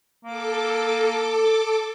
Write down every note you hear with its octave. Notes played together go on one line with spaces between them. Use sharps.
A#3 A4 D6